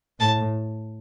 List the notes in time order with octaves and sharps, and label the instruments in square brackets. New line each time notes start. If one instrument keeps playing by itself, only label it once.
[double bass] A2 [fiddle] A5